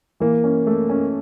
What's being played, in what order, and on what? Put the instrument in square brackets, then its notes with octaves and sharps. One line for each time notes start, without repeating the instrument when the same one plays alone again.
[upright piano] E3 [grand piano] A#3
[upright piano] C#4
A3
C#4